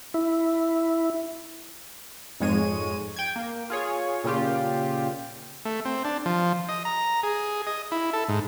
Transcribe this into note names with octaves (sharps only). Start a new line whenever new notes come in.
E4
F2 G#2 G#3 C#5 D#7
G5 G#6
A#3
F4 G#4 C#5
A#2 C#3 F4 G4
A3
C4
D4
F3
D#5
A#5
G#4
D#5
E4
A4
G#2